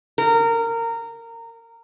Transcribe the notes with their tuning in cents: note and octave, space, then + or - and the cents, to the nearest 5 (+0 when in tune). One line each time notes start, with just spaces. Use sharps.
A#4 -20